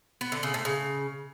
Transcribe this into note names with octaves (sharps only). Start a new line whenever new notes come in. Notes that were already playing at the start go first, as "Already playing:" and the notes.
B3
D3
C#3
A2
C#3